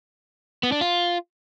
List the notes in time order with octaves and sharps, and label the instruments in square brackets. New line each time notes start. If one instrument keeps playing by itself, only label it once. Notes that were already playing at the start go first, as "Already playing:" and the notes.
[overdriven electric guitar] B3
D4
F4